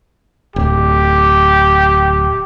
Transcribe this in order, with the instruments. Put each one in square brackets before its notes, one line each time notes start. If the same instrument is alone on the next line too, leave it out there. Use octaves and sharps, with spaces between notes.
[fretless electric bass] D1 [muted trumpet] G4